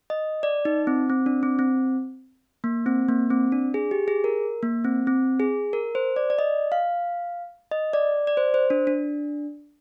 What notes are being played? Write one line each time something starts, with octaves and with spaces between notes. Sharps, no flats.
D#5
D5
D#4
C4
C4
D4
C4
C4
A#3
C4
A#3
C4
D4
G#4
G4
G#4
A#4
A#3
C4
C4
G#4
A#4
C5
D5
D5
D#5
F5
D#5
D5
D5
C5
C5
D4
D4